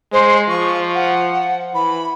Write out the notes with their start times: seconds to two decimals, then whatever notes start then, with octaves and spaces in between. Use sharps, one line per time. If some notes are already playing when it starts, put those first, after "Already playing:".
0.13 G#3 C5
0.49 F3 C#6
0.95 F#5
1.74 E3 B5